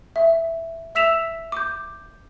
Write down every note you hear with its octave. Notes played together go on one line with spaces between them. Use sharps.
E5
E5 E6 B6 E7 F7
D6 G6